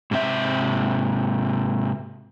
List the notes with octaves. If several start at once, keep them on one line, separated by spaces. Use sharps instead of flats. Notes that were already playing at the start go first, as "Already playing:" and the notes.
G#2 C3 E5